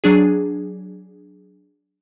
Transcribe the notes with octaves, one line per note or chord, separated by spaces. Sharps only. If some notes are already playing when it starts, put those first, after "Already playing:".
F#3 D4 G#4